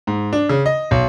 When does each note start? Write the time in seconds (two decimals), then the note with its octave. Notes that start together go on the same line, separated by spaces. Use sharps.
0.07 G#2
0.33 D4
0.49 C#3
0.66 D#5
0.91 B1